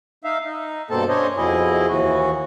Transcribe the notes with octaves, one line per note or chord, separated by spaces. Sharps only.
D#4 E5 F5
D#4
G2 B2 A#3 C4 A4 A5
C#4 D4 C5 C#5 D#5
F2 B2 E4 G#4 D#5
D#2 E3 F#4